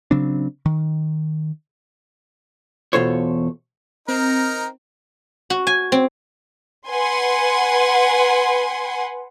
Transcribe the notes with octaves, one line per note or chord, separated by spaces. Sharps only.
C#3 F#3 C4 D4
D#3
E2 B2 F4 A4 C5 C#5
C4 D#4 A#4
F#4
G#5
C4
B4 F#5 G#5 C6